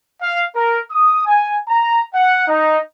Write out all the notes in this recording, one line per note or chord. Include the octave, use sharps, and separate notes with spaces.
F5
A#4
D#6
G#5
A#5
F#5
D#4